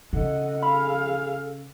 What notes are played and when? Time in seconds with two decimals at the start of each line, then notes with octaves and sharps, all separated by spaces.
0.13 C#3 A4 D#5 F#5
0.63 G#4 F5 B5